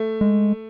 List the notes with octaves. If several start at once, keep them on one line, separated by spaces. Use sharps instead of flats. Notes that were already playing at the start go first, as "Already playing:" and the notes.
Already playing: A3
G#3